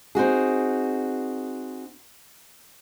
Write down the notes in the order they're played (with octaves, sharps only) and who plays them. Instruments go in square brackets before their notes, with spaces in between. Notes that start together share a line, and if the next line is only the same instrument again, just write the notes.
[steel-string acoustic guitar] C4 D#4 F#4 G#4